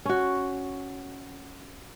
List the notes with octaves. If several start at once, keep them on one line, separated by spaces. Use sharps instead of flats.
C#4 F#4